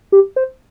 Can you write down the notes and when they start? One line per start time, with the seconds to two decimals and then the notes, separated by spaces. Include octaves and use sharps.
0.12 G4
0.36 C5